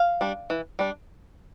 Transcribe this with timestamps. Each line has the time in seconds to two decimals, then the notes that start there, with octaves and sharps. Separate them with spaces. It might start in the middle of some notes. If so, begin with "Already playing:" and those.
Already playing: F5
0.21 G3 D4
0.50 E3
0.79 G3 D4